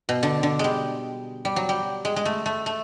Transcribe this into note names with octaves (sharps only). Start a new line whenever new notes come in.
B2
D3
D3
G3 G#3
G3
F#3
G3
G#3
G#3
A3
A3
A3